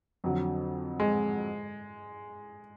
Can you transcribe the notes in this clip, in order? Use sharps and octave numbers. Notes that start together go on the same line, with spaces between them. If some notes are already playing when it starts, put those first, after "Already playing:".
F2 D3 F#3
G#3